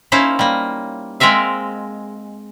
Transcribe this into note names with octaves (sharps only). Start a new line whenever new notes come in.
A#3 C#4 D#4 E4 C5 F5
G3 A#3
G#3 C4 A#4 E5 F5